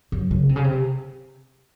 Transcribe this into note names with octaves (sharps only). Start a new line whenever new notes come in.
F#2
C#3
C3
C#3
C3